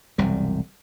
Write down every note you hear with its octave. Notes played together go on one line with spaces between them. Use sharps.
E1 C2 F#2 G3